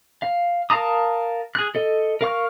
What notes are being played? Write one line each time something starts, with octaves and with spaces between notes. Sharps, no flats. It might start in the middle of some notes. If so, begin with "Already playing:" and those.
F5
A#4 F5 A5 A#5 D#6
G#4 F#6
A4 D#5
A#4 F5 C#6 F6